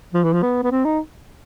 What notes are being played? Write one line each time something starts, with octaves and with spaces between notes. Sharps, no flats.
F3
E3
F3
B3
B3
C4
D#4